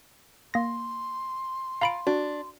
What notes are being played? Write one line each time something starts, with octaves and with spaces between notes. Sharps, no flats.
A#3 C6 A#6
F4 F5 A#5 B5 D7
D4 F#4